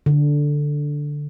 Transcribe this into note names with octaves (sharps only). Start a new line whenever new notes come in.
D3